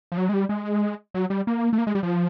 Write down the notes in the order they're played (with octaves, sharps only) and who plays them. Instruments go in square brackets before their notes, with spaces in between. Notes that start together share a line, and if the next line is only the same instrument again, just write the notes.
[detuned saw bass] F3
F#3
G#3
G3
G#3
F#3
G3
A#3
A3
A#3
G#3
G3
F3